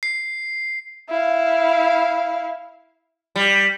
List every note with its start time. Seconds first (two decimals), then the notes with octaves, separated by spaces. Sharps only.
0.03 C7
1.09 E4 F5
3.36 G3